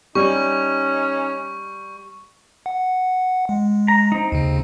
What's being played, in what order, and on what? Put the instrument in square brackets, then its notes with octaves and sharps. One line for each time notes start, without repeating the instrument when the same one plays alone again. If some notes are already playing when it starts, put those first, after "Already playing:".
[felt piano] G3 [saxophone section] C#4 D#4 [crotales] C#6
[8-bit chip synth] F#5
G#3
[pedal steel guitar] A#5
C4 D#4
[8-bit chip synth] D#2 C#3